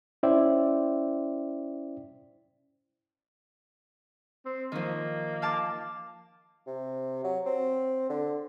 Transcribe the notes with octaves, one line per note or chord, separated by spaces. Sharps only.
C#4 E4 C5 D5 E5 G5
C4
D#3 F3 A#3
F5 A5 D6
C3
F#3
C4
D3